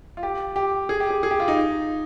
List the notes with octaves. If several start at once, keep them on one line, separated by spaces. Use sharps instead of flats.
F4
G4
G4
G#4
G4
G#4
G#4
G4
F4
D#4